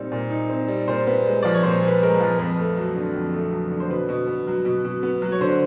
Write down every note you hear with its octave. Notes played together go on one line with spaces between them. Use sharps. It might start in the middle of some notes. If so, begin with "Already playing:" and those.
Already playing: A#2 G3 C4 D#4
A#2
D#4
C4
G3
A#2 C5
B3
G#3
F3 D5
C#5
A#2 C5
B3
B4
G#3 A#4
B4
F3
F2 B4
A3
F#3
D3
F2
A3
F#3
D3
C5
B2 B4
B2
B3
F#3
B2
B2
B3
F#3
C#5
D3 C5